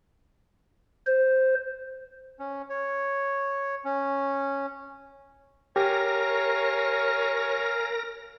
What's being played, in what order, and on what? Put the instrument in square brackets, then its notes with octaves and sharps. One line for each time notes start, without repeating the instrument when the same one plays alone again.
[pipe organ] C5
[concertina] C#4
C#5
C#4
[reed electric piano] G4 [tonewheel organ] A#4 A#6 [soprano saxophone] C#5 [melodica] F5 G#5 A#5